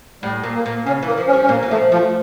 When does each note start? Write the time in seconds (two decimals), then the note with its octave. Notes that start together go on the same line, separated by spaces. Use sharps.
0.23 A2 G3
0.43 A#2
0.55 A#3
0.66 A#2
0.86 C#3 C#4
1.03 E3 A#3
1.18 F3
1.28 C#4
1.33 G3
1.43 C#4
1.49 A#2 A#3
1.63 E3
1.71 F3 A3
1.91 F3 A3